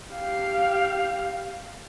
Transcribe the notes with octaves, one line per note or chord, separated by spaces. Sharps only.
G4 F5